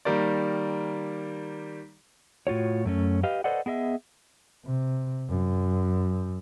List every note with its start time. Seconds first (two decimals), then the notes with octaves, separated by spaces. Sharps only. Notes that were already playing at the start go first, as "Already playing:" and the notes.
0.05 D#3 G3 A#3 D5
2.47 A2 F4 F#4 C#5
2.85 F#2 A3 C#4
3.23 G4 B4 D#5 F5
3.44 A4 B4 C5 D5 D#5 F#5
3.66 B3 G#4 D#5 E5
4.65 C3
5.29 F#2